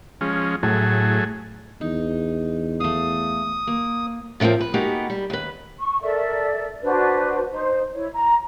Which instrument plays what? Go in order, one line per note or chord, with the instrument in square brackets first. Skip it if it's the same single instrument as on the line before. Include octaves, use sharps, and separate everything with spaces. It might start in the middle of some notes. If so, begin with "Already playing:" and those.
[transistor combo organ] F3 G#3 C#4
[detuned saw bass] A2 [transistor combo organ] F#3 A3 G#4
[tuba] E2 [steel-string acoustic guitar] D#4
[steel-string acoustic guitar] A3 F5 [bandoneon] D#6
[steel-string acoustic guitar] A#3
A2 D3 F3 A#3 C4
B4
G#3 A#3 B3 D#4 F#4 G4
G3
D#2 B4
[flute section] C#6
A4 A#4 D5 E5
D4 F#4 B4 C5
D#4 C5
E4 C#5
A#5